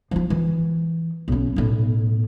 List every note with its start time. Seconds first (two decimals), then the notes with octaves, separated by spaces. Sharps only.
0.11 F3 F4
0.30 E3
1.28 B1 C#4
1.56 B1 A2